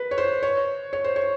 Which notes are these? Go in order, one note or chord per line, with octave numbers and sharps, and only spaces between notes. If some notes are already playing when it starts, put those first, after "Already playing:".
Already playing: B4
C#5
C5
C#5
C#5
C5
C#5